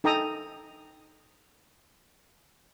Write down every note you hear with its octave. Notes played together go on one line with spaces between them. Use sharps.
D#4 A4 G5 A#5 D#6